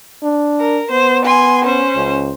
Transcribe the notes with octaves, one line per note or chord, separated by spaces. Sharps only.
D4
A#4
B3 C5
G#5 C6
C#4 C5
C#2